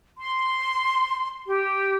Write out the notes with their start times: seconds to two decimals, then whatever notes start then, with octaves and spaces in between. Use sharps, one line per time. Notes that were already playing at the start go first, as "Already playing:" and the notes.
0.18 C6
1.47 G4